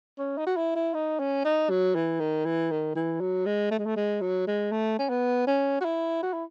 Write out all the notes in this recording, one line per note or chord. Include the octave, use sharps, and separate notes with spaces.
C#4
D#4
F#4
E4
E4
D#4
C#4
D#4
F#3
E3
D#3
E3
D#3
E3
F#3
G#3
A3
G#3
A3
G#3
F#3
G#3
A3
C#4
B3
C#4
F#4
E4
F#4
E4